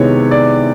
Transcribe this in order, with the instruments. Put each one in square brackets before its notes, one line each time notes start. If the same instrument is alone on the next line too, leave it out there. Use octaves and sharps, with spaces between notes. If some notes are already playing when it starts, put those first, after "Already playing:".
Already playing: [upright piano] C3 D#3 G#3 B3 E4 [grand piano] C#5
[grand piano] D5